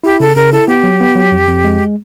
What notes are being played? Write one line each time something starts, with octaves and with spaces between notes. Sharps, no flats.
E4 G4
C#3 A4
C#3 A#4
E4 A4
B3 G4
F#3
B3
F#3
F2
F2
G#3